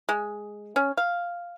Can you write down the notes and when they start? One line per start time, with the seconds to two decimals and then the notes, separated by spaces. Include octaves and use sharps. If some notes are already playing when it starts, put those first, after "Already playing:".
0.09 G#3
0.76 C#4
0.97 F5